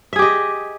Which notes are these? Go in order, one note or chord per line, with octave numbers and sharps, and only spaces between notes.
G4 G#4 D#5 E5